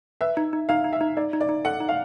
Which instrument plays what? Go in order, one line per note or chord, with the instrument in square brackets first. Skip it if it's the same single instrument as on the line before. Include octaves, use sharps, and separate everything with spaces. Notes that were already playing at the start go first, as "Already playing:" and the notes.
[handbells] B4 [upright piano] E5
[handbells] D#4
D#4
[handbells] D#4 [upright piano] F5
[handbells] D#4
[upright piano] E5
[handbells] D#4
[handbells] D#4 [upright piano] D5
[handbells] D#4
[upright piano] D5
[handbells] D#4
[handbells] A4 [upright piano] F#5
[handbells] D#4
[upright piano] F5